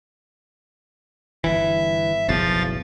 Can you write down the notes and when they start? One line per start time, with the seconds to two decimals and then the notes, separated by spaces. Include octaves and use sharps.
1.44 G1 C2 E3 E5
2.28 F#1 B1 E2 F3 F5 A6